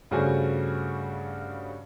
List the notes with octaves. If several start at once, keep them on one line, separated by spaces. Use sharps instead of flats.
G2 C#3 A3 F#4 C5 G#5